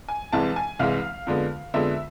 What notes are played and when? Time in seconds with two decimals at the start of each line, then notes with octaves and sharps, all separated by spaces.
0.08 G#5
0.32 C2 C3 E3 G#3 A5
0.56 G#5
0.79 C2 C3 E3 G#3 F5
1.27 F2 D3 G#3 B3
1.74 F2 D3 G#3 B3 E5